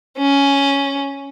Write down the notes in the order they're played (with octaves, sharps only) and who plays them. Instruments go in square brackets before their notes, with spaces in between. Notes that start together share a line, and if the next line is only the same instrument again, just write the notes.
[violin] C#4